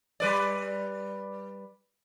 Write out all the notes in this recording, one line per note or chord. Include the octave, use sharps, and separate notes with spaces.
G3 B4 D5